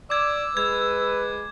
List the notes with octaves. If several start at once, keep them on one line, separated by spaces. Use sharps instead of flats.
D5 D6 E6 G#6
G#3 B4 G#6